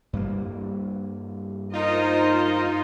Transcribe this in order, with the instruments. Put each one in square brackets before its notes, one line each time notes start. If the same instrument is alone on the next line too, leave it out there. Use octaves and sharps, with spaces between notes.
[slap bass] G2 G3 A#3
[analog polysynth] D#4 F4 [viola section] A#4 C5 D#5